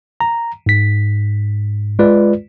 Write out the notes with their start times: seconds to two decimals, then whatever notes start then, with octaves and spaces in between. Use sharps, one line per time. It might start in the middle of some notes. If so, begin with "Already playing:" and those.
0.21 A#5
0.66 G#2 B6
1.99 G#3 F4 B4 D5